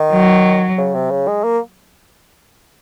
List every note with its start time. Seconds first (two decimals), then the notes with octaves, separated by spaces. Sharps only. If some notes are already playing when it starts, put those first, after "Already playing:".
Already playing: D#3
0.12 F#3
0.78 C#3
0.95 C3
1.11 C#3
1.28 G#3
1.44 A#3